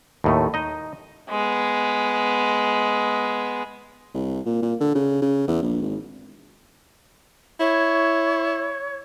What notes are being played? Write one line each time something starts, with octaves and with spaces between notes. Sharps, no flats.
D#2 A2 A3
D#4 D#5
G#3 B3
C2
A#2
A#2
D3
C#3
C#3
E2
A#1
G#1
E4 C#5